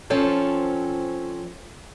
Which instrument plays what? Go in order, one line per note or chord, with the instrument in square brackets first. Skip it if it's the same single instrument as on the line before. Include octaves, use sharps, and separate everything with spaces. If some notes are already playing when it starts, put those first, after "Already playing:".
[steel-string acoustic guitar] F3 C4 C#4 A4